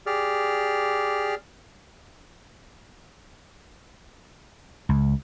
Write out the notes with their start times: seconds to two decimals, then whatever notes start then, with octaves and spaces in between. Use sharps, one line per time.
0.06 G4 G#4 D5 F6
4.89 C#2